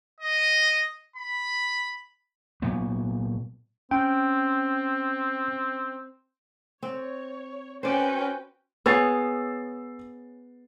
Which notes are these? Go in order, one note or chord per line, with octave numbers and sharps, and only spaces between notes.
D#5
B5
A#2 F#3 B3
C4 C#4 G5
C4 C#5
C#4 F#4 B4 C5 D5 G5
B3 G#4 C#5 E6 A6 C7